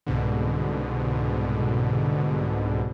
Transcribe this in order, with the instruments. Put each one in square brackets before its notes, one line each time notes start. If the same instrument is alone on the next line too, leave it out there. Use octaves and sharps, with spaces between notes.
[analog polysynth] C2 G#2 B2 D3